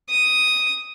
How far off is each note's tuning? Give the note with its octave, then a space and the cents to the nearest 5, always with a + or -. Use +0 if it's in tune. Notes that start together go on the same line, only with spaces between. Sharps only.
D#6 +5